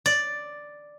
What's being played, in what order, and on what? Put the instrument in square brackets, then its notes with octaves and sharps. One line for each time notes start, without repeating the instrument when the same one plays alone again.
[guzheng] D5